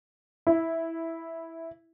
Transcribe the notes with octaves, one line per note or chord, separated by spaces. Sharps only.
E4